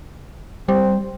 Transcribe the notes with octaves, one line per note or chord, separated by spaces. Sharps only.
G3 C4